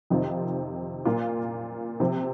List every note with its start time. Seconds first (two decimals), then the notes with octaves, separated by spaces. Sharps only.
0.10 F2 C3 D#3 C4 F4
1.05 A#2 A#3 F4
2.00 C3 F3 C4